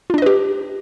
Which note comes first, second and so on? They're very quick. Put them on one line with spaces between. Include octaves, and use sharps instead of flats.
F4 D4 D#5 B4 G4